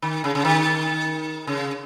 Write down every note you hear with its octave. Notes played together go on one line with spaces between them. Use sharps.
D#3
C#3
C#3
D#3
C#3